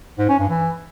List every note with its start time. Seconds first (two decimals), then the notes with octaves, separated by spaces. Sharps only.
0.18 G#2
0.29 C#4
0.39 G2
0.49 E3